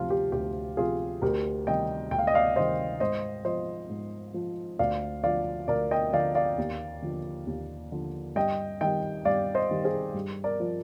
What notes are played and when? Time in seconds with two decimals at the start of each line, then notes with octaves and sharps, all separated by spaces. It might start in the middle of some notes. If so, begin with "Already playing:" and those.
Already playing: D2 C3 F3 F4
0.10 G4
0.32 D2 G4
0.77 C3 F3 F4 G#4
1.22 D2 G4 A#4
1.67 C3 D#3 G3 D#5 G5
2.11 D2 G5
2.19 F5
2.27 D#5
2.34 D5 F5
2.56 C3 D#3 G3 C5 D#5
3.00 G#2 C5 D#5
3.45 F3 C5 D#5
3.90 G#2
4.34 F3
4.79 D2 D5 F5
5.23 D3 F3 D5 F5
5.68 D2 A#4 D5
5.91 D#5 G5
6.13 D3 F3 D5 F5
6.35 D5 F5
6.58 D#2
7.02 D3 F3
7.47 D#2
7.92 D3 F3
8.36 G2 D#5 G5
8.81 D#3 G3 D#5 G5
9.25 G2 D5 F5
9.55 C5 D#5
9.71 D#3 G3
9.84 G#4 C5
10.14 G2
10.44 A#4 D5
10.60 F3